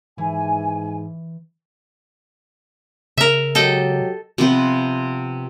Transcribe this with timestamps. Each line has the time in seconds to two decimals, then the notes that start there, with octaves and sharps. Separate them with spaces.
0.18 G#2 E3 G#5
3.18 C#3 A#4 E5
3.55 F#3 G#3 G4 A4 D#5 G5
4.38 C3 F3 B3 C5